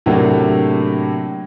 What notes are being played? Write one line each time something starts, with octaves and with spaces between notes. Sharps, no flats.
A2 C3 F#3 A#3 D4